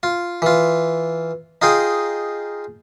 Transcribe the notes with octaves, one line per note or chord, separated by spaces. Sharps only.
F4
E3 F4
D#4 F4 G#4 G5